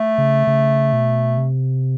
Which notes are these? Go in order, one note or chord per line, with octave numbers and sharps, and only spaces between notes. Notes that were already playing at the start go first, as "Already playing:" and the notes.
Already playing: A3
C#3
C#3
B2
C3